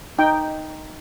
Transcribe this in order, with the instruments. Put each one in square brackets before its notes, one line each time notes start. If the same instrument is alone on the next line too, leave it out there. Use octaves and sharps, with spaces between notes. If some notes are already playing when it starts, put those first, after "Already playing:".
[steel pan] D#4 G5